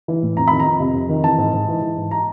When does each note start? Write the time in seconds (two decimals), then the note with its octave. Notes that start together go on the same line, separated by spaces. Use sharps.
0.08 E3
0.22 A2
0.36 F2 A#5
0.48 D#3 B5
0.60 A#5
0.66 F2
0.80 C3
0.95 F2
1.09 D#3
1.24 E3 A5
1.38 G#2
1.53 G#2
1.68 E3
1.82 E3
1.97 G#2
2.11 A#5